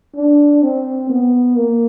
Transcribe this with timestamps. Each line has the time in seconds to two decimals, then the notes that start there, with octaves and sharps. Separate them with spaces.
0.16 D4
0.63 C4
1.10 B3
1.56 A#3